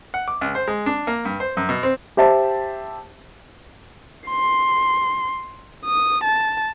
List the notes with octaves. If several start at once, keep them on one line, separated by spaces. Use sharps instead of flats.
F#5
D6
C#2
C5
G#3
D4
A#3
G2
C5
F#2
B2
C4
G4 C5 E5 A5
C6
D#6
A5